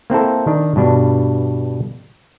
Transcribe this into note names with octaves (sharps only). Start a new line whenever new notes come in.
A#3 C4 E4 A4
D#3 D4
G2 B2 D4